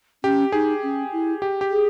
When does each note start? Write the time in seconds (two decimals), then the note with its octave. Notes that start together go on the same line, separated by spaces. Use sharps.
0.24 C#4 G4
0.52 D#4 G#4
0.83 C#4
1.12 E4
1.42 G4
1.61 G4
1.71 G#4